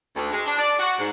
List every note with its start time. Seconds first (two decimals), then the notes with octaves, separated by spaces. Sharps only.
0.16 D2
0.32 G#3
0.45 D4
0.59 D5
0.79 F#4
0.98 G#2